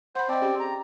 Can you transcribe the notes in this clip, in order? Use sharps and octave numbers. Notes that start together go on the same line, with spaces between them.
C5 F#5 B5
C4 D5 D#5 A5
C#4 G4 G#4
A#5